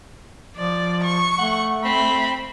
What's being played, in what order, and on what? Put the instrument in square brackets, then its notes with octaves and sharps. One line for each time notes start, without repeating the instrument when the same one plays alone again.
[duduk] F3 [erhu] D5
[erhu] C#6
[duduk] A3 [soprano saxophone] F#5
[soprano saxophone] C4 [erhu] B5